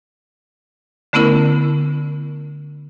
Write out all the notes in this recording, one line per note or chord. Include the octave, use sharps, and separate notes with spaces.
D3 A3 B3 C#4 E4 A#4